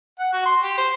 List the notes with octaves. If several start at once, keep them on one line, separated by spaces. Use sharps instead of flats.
F#5
F#4
C6
G4
C5